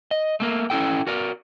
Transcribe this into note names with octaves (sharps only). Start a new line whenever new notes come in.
D#5
A3 A#3 A#4
C#4 E4 A4 G5
F#4 A#4 D5